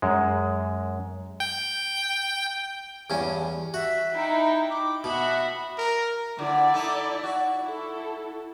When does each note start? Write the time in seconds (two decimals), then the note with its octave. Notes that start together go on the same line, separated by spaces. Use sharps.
0.02 F#2 G#3
1.40 G5
3.10 E2 G2 C#4
3.74 F#4 E5
4.14 D#4 E4 G5
4.70 D6
5.04 B2 F#4 E5 B5
5.78 A#4
6.39 D3 E4 D5
6.74 D#4 A4
7.24 F#4
7.63 E4 A4